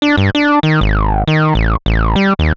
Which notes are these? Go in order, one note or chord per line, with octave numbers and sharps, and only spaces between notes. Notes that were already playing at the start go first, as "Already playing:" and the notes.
D4
G2
D4
D#3
G#1
D#3
A1
A1
G3
D#2